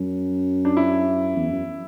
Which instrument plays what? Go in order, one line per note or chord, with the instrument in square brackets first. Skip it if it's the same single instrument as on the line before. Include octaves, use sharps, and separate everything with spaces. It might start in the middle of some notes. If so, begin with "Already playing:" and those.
Already playing: [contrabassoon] F#2
[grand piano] D4
E4
[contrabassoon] E2
F#2